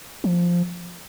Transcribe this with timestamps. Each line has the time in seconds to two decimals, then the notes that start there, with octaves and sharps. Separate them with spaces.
0.24 F3